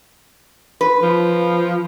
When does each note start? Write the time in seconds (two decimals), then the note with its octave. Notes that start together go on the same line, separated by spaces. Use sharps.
0.81 B4
1.02 F3